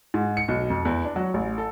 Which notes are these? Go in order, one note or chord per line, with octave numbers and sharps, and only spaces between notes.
G#2
C#7
B1
F2
E2
D4
F#3
A1
A4